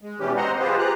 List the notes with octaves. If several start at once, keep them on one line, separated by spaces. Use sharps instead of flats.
G#3
B2 E3 G3 C#4 G4
C4 C5 D#5 F#5 A#5 C6
F4 G4 G#4 B4 C5
G4 A#5 F#6